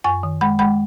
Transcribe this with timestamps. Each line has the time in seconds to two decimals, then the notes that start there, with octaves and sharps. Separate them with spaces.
0.04 F#2 G#5 C#6
0.23 D#3
0.41 G#3 F#5 B5
0.59 G#3 F#5 B5